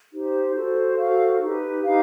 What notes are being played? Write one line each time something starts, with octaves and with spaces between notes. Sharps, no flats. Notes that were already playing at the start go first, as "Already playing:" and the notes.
D#4 G4 C5
F#4 A4 C5
F#4 A4 C5 F5
D#4 G4 B4
D#4 G4 B4 F5